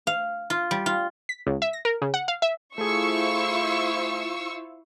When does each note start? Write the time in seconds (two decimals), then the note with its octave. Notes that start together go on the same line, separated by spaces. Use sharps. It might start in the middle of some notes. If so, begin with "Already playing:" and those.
0.07 F5
0.50 F4
0.71 G3
0.86 F4
1.29 B6
1.47 C#2
1.62 E5
1.73 A#6
1.85 A#4
2.02 C#3
2.14 F#5
2.28 F5
2.42 E5
2.78 A3 E4 F4 G#4 C5 F5 C#6 E6